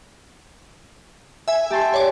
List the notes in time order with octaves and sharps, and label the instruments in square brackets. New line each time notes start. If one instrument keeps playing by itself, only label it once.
[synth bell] E5 G#5
[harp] G4 A5 C6
[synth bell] C#5 D5